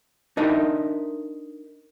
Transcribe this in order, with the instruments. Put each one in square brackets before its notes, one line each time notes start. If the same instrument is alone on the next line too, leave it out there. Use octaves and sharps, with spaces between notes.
[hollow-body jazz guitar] D4 D#4 A#4 D#5 E5